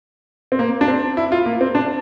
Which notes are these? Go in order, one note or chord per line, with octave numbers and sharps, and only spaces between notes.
C4
A#3
D4
C4
E4
F4
A#3
C4
D4